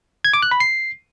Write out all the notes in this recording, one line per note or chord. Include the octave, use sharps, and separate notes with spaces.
G#6
D6
F#6
B5
C7